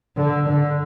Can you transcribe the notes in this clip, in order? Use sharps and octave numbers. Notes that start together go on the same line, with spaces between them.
D3
D3